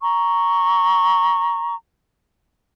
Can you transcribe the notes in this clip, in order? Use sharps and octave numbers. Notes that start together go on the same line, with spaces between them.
A#5 C#6